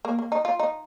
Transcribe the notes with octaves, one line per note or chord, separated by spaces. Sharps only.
A#3
A#3
D#4
F4
D#4